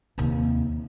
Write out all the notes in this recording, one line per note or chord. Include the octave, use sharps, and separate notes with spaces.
D#2 C3